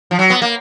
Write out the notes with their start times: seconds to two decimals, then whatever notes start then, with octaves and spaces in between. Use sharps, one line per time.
0.11 F3
0.19 F#3
0.30 B3
0.42 A#3